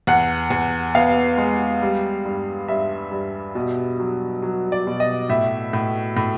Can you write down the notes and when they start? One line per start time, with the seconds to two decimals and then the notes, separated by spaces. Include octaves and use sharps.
0.07 E2 F#5
0.50 E2
0.95 B3 F5
1.38 G#3
1.82 G3
2.25 G2
2.68 G2 E5
3.11 G2
3.55 B2
4.00 F#3
4.42 F#3
4.72 D5
4.87 B2
5.00 D#5
5.30 A2 E5
5.73 A2
6.17 A2